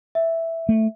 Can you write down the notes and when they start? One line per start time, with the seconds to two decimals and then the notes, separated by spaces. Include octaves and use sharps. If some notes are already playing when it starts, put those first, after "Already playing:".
0.15 E5
0.69 A3